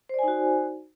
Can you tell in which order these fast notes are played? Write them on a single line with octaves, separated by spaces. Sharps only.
C5 D5 G#5 D#4 F#4